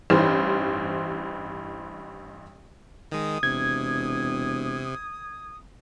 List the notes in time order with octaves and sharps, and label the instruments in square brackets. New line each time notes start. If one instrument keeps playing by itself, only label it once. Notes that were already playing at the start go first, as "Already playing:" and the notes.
[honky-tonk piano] A1 G2 E3 D#4 C5
[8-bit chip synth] D#3 G#3 [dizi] D#6
[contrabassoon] E1 [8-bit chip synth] C3 [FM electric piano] G#6